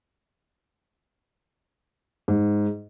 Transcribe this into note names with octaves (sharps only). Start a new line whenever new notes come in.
G#2